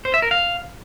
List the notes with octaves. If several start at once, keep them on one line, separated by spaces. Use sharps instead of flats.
C5
E5
A#4
F5